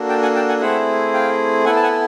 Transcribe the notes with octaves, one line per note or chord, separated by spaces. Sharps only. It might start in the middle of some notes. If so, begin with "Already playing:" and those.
Already playing: A#3 D4 F#4 A4
G5 A5
F#5 G#5
G5 A5
F#5 G#5
A3 C4 E4 G#4 E5 F#5
F5 G5
B3 E4 A4 F#5 G#5
A5
F#5 G#5